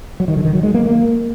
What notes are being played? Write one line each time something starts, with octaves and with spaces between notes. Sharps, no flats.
F#3
D#3
D3
D#3
F#3
G#3
A#3
A#3